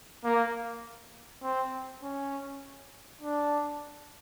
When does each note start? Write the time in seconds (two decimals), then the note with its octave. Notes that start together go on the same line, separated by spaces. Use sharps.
0.24 A#3
1.43 C4
2.03 C#4
3.22 D4